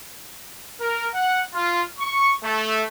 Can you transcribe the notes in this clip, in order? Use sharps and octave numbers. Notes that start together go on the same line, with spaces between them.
A#4
F#5
F4
C#6
A3